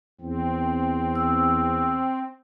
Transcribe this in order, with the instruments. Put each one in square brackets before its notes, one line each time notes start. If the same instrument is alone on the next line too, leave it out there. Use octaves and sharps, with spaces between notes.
[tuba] E2 [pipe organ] C4
[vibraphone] E6